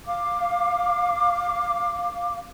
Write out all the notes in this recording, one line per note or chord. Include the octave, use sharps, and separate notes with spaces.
F5 D6